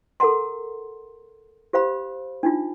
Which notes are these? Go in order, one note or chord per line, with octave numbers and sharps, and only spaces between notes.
A4 A#4 F#5 A#5 C6
G4 C5 F5 B5
D4 D#4 F4